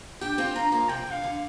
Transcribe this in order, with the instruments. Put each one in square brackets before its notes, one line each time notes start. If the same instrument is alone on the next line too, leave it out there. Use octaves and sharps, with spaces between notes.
[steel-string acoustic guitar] D4 G4 [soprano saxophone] G5
[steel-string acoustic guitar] C4 F4
[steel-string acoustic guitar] A#3 D4 [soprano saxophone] A#5
[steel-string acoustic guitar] F3 A#3
[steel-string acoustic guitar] C3 F3 [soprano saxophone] G5
[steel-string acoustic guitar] D3 [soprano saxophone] F5
[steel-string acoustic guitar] D3